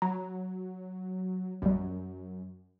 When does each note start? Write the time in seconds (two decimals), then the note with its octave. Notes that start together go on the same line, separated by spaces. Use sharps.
0.02 F#3 A#5
1.62 A#1 F#2 G3